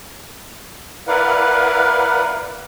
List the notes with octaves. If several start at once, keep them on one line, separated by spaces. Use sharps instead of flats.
E4 A#4 B4 D5 F5 F#5